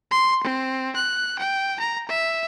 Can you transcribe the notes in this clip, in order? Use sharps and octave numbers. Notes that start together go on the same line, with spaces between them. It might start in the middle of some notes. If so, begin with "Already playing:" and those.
C6
C4
F#6
G5
A#5
E5